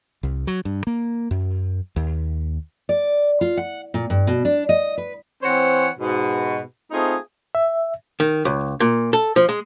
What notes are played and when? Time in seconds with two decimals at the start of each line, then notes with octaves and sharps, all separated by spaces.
0.23 C2
0.47 F#3
0.65 G2
0.87 A#3
1.31 F#2
1.96 D#2
2.89 D5
3.41 F4
3.57 F#5
3.94 A#2
4.10 G2
4.27 B2
4.45 D4
4.69 D#5
4.98 B4
5.42 E3 C4 C5 C#5 F#5
5.99 G#2 B2
6.91 A3 C4 D#4 F4 G#4
7.55 E5
8.20 D#3
8.45 C#2
8.80 A#2
9.13 A4
9.36 F3
9.49 G#3